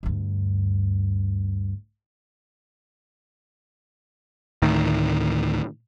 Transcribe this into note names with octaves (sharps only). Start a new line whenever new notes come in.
D2 G2
D2 A2 D#3